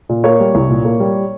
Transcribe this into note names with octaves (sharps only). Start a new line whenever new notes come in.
A#2
A#3 C#5
G3
C2
A#2
A#3
G3